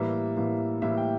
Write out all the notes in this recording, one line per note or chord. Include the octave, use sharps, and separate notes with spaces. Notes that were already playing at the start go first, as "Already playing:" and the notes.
Already playing: A2 E3 G3 A#3 E5
A2 E3 G3 A#3
A2 E3 G3 A#3 E5
G5